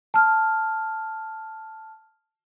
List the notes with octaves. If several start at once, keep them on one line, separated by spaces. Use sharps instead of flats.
A5 F6